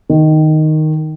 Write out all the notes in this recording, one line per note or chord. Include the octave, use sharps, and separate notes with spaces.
D#3